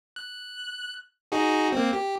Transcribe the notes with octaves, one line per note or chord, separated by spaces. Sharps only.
F#6
D#4 F#4 G#4
A#3 C4
G4